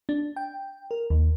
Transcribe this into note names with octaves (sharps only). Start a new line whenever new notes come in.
D4
G5
A#4
D#2